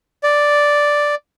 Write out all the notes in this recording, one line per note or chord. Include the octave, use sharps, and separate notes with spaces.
D5